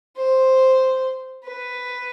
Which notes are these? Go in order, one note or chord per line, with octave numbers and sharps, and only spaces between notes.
C5
B4